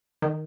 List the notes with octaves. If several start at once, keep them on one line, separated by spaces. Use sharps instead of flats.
D#3